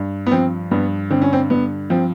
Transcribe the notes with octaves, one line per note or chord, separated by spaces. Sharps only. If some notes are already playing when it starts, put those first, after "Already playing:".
Already playing: G2
B3
F3 C4
G2 B3
D3 C4
C#4
C4
G2 B3
F3 C4